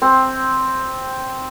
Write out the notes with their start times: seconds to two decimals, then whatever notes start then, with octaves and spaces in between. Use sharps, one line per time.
0.02 C4